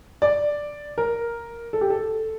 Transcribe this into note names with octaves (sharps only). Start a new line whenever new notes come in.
D5
A#4
A4
G4
A4